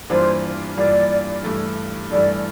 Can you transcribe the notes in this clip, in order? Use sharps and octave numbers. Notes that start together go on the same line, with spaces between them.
G2 E3 A#3 D4 F4 C5
G2 E3 A#3 D4 F4 D5
G2 E3 A3
G2 E3 A3 D5